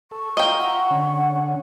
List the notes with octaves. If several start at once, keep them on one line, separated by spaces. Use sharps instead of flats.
A4 C#6
F4 D#5 F5 G5 A#5
F4 E5 F#5 A#5
D3 C#4